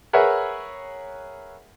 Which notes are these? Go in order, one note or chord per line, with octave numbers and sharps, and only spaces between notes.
G#4 A#4 B4 C#5 E5 F#5